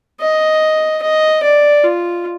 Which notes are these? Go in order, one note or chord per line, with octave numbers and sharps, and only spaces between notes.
D#5
D#5
D5
F4